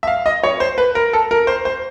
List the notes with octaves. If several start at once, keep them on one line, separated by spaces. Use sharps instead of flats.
E5
F5
D#5
C#5
C5
B4
A#4
A4
A#4
C5
C5